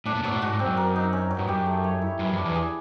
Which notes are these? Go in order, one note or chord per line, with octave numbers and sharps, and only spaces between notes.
A2 D4
A#2
B2 F#3
A2
G#2 F#4
G#2
C4
F#2
A#4
D#4
C#4
F#3
G2
F#2 G4
A3
C#5
E4
F#2 B4
F2 D4
E2
G#4